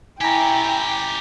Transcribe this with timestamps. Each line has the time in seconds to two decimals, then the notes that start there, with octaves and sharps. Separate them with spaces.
0.21 C#4 E4 G4 G5 G#5 A#5